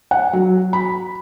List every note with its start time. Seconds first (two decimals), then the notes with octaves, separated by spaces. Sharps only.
0.11 F#5
0.33 F#3
0.73 B5